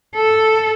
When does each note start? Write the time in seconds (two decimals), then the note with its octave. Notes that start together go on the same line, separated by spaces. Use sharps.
0.15 A4